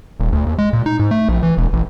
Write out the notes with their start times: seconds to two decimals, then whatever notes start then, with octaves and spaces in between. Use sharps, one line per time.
0.20 D#1
0.32 D2
0.46 D#2
0.58 G#3
0.73 A#2
0.86 D#4
0.99 G#2
1.11 A3
1.29 A#1
1.43 E3
1.58 E1
1.73 A1